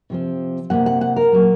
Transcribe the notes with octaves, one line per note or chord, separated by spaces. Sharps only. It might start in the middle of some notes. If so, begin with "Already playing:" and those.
C3 F3 C4
C3 F3 A#3 F#5
F#5
F#5
A#4
A#2 F#3 A#3